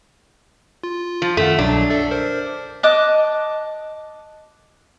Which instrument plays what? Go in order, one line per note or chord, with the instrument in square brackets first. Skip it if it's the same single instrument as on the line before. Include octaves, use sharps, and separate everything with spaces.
[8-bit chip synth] F4
[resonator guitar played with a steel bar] F3
[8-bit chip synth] F#2 D#3 F#5 [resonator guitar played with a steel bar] A3
[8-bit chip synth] C2 B2 F#3 [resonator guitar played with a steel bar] D4
[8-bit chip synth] A4 D5 E5
A#4 C5
[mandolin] D#5 A5 D6 F#6